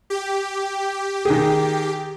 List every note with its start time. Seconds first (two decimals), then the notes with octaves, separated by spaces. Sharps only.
0.10 G4
1.25 D#3 G#4